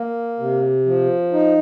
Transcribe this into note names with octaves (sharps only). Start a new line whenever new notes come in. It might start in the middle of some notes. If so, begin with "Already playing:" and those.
Already playing: A#3
C3
F3
D#4